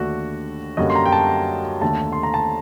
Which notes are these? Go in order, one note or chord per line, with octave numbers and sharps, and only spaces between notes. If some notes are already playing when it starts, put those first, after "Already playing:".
Already playing: D#2 D3 A3 D4 F#4
F#2 D3 G3 A#3 D#5
C6
A#5
G5
A5
D#2 D3 A3 A5
C6
A#5
A5